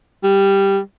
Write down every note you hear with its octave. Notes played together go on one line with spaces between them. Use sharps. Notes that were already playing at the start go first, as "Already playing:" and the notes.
G3